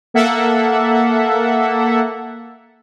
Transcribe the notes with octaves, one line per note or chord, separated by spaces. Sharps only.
A#3 A4 E5 F#5